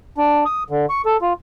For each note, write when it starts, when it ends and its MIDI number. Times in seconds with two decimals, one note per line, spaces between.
0.18 0.44 62
0.45 0.63 87
0.70 0.86 50
0.90 1.02 85
1.06 1.17 69
1.22 1.33 65